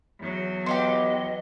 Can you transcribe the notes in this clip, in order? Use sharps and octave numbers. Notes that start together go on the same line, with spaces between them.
E2 F#3
B3 G4 D#5 F5 C6